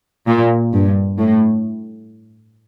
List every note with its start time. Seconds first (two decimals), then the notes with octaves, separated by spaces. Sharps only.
0.28 A#2
0.73 G2
1.18 A2